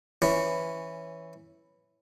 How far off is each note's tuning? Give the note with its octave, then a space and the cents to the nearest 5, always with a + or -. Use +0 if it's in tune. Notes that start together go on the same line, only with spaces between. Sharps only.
E3 +0 C#4 +0 E4 +0